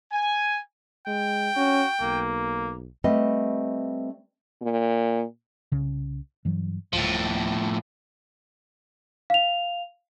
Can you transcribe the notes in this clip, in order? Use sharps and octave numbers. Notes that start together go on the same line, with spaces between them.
G#5
G#3 G5
C#4 F#4
B1 A#3
G3 A3 C4 B4 D#5 F5
A#2
C2 C#3
G2 E3 F#3
D1 A2 F3
F5 F7